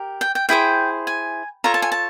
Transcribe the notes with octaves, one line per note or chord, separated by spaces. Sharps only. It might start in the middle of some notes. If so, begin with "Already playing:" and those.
Already playing: G4 A#4
G5
G5
E4 G#4 C5 G5
G#5
F4 A4 C#5 A#5
A5
G#5
A5